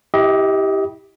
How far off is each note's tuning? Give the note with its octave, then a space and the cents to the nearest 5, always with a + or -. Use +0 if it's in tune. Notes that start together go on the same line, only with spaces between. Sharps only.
E4 -20 G4 +0 D#5 +25